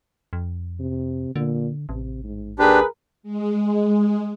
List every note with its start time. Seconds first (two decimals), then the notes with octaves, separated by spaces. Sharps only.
0.33 F2
0.80 C3
1.36 A#2 D3
1.89 A1 C3
2.24 G#2
2.59 D#2 D4 G4 G#4 A#4 B4
3.23 G#3